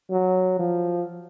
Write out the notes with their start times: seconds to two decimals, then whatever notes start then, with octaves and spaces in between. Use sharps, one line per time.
0.11 F#3
0.59 F3